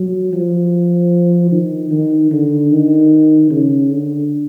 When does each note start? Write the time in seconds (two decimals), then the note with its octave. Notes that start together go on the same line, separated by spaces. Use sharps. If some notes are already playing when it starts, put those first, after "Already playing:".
Already playing: F#3
0.33 F3
1.52 D#3
1.91 D#3
2.32 D3
2.70 D#3
3.50 C#3
3.90 D3